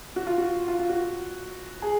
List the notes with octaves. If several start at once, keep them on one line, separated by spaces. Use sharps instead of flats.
F#4
F4
F#4
F4
F4
F#4
G#4